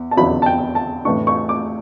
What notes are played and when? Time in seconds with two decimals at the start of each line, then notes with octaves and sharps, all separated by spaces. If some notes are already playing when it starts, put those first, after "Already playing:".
Already playing: E2
0.11 A5
0.16 E2 D3 F#3 C#4 E4 B5
0.42 A5
0.46 G5
0.75 A5
1.05 A2 E3 A3 D4 C#6
1.27 C#6
1.49 D6